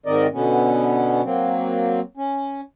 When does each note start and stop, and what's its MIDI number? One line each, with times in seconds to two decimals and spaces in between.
0.06 0.27 44
0.06 0.27 51
0.06 0.27 60
0.06 0.27 70
0.06 0.27 74
0.06 0.27 75
0.33 1.22 47
0.33 1.22 50
0.33 1.22 59
0.33 1.22 61
1.24 2.00 54
1.24 2.00 58
1.24 2.00 60
2.17 2.61 61